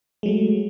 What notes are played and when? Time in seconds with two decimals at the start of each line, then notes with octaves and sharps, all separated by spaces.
0.23 G#3
0.26 F#3
0.28 A3